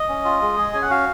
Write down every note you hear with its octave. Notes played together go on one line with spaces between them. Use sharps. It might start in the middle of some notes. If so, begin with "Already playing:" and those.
Already playing: D#5
C#4
F4
G#3
G#4
C#4 G#5
F#5
F#4 F5